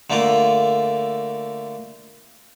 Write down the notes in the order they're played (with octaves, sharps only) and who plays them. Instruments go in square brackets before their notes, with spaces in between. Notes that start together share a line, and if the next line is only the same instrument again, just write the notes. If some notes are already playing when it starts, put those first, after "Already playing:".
[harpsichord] D3 A3 A#3 F4 A#4